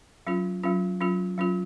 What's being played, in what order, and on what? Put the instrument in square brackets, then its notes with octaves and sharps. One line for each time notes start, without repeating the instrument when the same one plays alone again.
[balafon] F#3 C#4 F4
F#3 C#4 F4
F#3 C#4 F4
F#3 C#4 F4